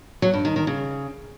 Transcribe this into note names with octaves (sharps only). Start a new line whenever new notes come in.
F#3
G2
D#3
D#3
C#3